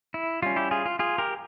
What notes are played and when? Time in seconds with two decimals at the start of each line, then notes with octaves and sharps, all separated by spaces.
0.14 E4
0.42 G3 C#4 F4
0.56 E4 G4
0.71 F4 G#4
0.85 F4
0.99 F4 G#4
1.18 G4 A#4